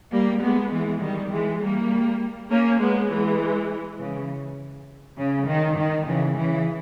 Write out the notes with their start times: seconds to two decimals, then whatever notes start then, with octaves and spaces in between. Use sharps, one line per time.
0.12 G3 A#3
0.42 G#3 B3
0.72 E3 G#3
1.01 D#3 G3
1.31 E3 G#3
1.61 G3 A#3
2.50 A#3 C#4
2.80 G#3 B3
3.10 E3 G#3
3.98 C#3 E3
5.17 C#3
5.47 D#3
5.76 D#3
6.07 C#3 E3
6.36 C#3 E3